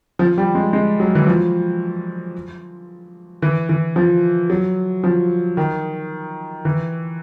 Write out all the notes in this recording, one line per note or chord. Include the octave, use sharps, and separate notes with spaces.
F3
G3
G#3
G#3
F#3
E3
F3
E3
E3
F3
F#3
F3
D#3
E3